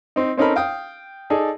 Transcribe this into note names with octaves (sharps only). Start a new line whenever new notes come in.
C4 D#4
C4 C#4 D#4 A4 A#4 B5
F5 G5 D#6
D#4 G#4 A4 D5